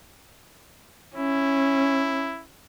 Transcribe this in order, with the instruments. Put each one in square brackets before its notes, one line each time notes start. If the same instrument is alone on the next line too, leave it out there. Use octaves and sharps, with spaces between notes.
[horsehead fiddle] C#4 [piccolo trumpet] E4